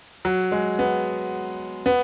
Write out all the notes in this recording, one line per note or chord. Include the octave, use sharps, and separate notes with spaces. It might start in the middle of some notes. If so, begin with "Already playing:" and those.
F#3
G#3
B3
B3